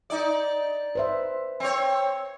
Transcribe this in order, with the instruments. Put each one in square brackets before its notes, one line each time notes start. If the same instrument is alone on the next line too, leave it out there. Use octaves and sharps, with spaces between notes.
[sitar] D#4 D5
[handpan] B4 C5 E5
[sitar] C4 C#5